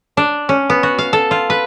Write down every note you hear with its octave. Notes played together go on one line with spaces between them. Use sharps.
D4
C#4
B3
F#4
F5
A4
F4
B4